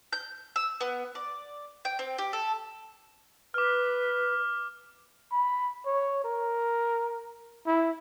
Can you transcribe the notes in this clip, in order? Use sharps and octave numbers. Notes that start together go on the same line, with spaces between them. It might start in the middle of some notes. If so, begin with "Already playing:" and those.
G6
E6
B3
D5
G5
C4
G4
A4
B4 D6 F6
B5
C#5
A#4
E4